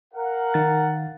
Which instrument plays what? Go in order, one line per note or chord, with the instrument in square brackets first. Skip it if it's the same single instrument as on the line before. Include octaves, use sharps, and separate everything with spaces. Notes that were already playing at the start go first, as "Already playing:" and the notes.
[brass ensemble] A#4 F5 F#5
[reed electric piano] D#3 A6